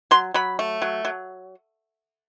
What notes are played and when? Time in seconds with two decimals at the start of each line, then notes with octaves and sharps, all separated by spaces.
0.11 F#3 C6
0.34 F#3 B5
0.59 A3
0.82 F#3
1.05 F#3